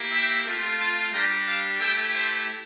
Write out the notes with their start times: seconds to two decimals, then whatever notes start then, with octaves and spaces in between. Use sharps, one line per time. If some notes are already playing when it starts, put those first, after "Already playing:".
Already playing: A#3 E4 G4
0.12 E5 G5
0.46 A3 C4 F4
0.79 F5 A5
1.13 G3 D4 G4 G5 A#5
1.46 F5 A5
1.79 A3 E4 G4 E5 G5
2.14 C5 E5